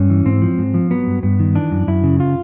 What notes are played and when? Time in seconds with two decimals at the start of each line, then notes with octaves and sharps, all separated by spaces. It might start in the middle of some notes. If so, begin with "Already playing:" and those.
Already playing: G2 C#4
0.10 E3
0.25 G#2 C4
0.42 F3
0.58 G#2
0.74 F3
0.90 F#3 B3
1.07 G2
1.23 G2 B3
1.40 D#3
1.55 E3 D4
1.71 F#2
1.87 F#2 E4
2.04 C#3
2.20 F4